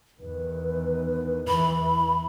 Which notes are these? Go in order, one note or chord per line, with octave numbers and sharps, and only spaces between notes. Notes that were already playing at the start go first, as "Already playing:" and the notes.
E2 D#3 B4
E2 E3 B5